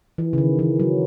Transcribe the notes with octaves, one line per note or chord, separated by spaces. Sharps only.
E3
C#3
D#3
E3
F#3